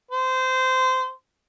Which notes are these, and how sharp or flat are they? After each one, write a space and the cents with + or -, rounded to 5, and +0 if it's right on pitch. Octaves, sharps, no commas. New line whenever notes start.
C5 -20